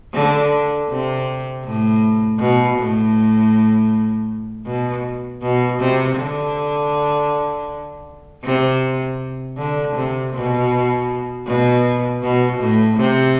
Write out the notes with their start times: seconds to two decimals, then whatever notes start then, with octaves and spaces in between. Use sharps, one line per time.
0.14 D3
0.89 C3
1.64 A2
2.39 B2
2.78 A2
4.66 B2
5.43 B2
5.79 C3
6.17 D3
8.44 C3
9.58 D3
9.96 C3
10.33 B2
11.47 B2
12.22 B2
12.59 A2
12.97 C3